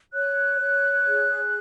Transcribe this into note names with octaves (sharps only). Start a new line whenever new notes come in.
C#5 F#6
C#5
G#4